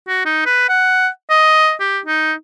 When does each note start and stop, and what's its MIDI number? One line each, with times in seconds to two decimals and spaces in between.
0.08 0.22 66
0.25 0.42 63
0.45 0.68 71
0.69 1.08 78
1.30 1.73 75
1.80 1.99 67
2.06 2.33 63